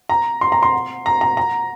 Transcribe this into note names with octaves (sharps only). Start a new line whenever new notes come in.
A#5
C6
A#5
C6
A#5
A#5
A#5